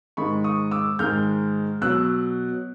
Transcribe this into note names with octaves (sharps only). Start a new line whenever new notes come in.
G#2 D#3 G#3 B5 C#6
C#6 D#6
D6 E6
G#2 D#3 G#3 F6 G6
B2 F#3 E6 F#6